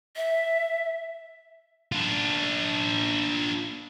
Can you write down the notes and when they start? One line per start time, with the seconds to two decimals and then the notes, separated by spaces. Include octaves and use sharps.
0.16 E5
1.92 D4 F4